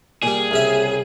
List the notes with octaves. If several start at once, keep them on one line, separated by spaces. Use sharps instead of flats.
A#2 G3 G#4
C2 C#3 E5